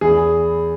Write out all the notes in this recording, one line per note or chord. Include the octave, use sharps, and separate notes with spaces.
E2 E3 B3 E4 G#4